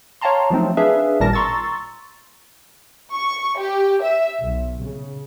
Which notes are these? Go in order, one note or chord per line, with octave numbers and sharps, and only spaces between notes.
C#5 F5 G5 A5 A#5 C6
F3 F#3 A3 C4 D#4
D4 G#4 B4 E5 F5
G#1 A#2 G3 A#4 A5 A#6
A#5 C6 C#6 E6 A6
C#6
G4
E5
B1
C#3